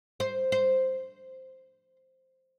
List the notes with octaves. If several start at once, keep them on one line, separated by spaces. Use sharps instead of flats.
C5
C5